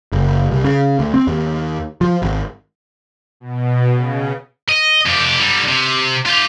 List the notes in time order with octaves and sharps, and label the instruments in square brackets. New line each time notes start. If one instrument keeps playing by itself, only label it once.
[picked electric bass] F#1
C2
C#3
D2
C4
D#2
F3
G#1
[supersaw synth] B2
C#3
[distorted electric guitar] D#5
F2 G4
D3 G3
C3
F4 G4